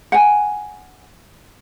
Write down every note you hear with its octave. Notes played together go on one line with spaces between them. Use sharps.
F#5 G#5